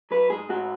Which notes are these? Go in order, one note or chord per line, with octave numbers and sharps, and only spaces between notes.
F#3 B4
G#2 G#4
G#2 F#4